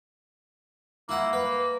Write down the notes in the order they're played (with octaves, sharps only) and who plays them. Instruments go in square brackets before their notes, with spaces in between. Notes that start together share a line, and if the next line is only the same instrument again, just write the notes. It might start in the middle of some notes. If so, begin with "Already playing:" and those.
[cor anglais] A#3 [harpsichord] E4 F#5
[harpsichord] B4